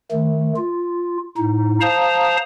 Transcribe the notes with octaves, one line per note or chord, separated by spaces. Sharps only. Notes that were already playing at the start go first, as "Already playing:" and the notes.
D#3 A3
F4
A2 D#4
C5 F5 A5 A#5 D#6